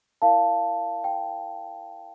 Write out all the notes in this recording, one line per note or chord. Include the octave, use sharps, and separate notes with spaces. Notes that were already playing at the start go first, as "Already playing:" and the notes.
E4 A#4 D5 F5 A5
G5